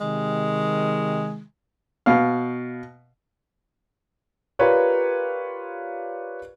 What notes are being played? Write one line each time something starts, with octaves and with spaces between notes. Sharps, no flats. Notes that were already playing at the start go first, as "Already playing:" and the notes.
C3 D#3 G#3
B2 F5
F4 G4 A#4 B4 C#5 D5